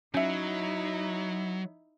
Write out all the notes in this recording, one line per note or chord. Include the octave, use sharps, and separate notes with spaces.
F#3 C#4 D#4 E4 E5